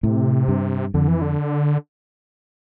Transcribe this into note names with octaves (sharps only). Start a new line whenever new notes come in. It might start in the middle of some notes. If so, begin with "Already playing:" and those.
A2 C3
G2
F2 D3
E3
D3